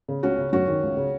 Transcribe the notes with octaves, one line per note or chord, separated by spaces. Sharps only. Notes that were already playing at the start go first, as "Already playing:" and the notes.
C#3
C#2 C#4 F#4
C#3
F#2 C#4 F#4
D#3
C#2
C#3